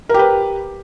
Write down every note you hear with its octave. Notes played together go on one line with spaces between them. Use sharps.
G4 A#4 B4